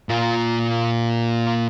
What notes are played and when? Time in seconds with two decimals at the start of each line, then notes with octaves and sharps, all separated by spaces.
0.09 A#2 F4